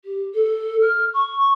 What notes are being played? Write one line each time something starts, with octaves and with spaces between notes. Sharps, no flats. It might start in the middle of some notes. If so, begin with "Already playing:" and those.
G4
A4
F6
C#6